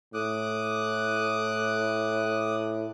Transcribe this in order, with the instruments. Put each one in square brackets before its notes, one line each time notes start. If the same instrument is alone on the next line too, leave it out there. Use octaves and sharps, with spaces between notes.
[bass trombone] A2 [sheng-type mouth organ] D6 D#6 F#6